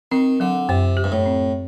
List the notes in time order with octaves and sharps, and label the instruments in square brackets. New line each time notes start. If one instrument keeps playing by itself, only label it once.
[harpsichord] D#3 [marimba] C4
[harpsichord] D3 [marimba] F#3
[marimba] F#2 [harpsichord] C3
[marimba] G4
[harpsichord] G2
A2
[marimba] C4